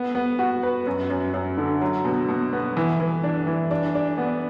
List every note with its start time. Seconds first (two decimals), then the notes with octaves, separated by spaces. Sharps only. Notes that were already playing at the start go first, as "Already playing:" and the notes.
Already playing: B3
0.15 B3
0.39 F#4
0.63 B4
0.86 F#2
1.10 F#2
1.34 F#2
1.57 D3
1.81 F#3
2.05 B2
2.28 B2
2.53 B3
2.77 E3
3.00 E3
3.24 D4
3.47 E3
3.71 D4
3.95 D4
4.18 B3